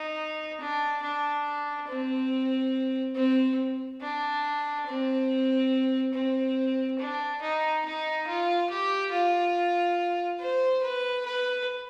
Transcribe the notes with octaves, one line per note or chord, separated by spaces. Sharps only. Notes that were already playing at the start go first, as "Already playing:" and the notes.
Already playing: D#4
D4
D4
C4
C4
D4
C4
C4
D4
D#4
D#4
F4
G4
F4
C5
B4
B4